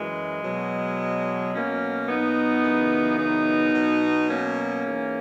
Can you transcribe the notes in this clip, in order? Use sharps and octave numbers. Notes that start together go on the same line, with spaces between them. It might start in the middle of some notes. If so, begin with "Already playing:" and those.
Already playing: F#2 E3 G#3
B2 F#3
B2 F#3 A#3 C#4
B3 D#4
F#2 C#3 E3
B3 D#4
B2 F#3
A#3 C#4
G#2 E3